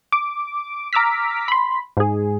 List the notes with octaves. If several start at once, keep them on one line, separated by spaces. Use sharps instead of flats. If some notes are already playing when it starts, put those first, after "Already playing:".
D6
A#5 D6 E6 F6 B6
B5 C6
G#2 G#4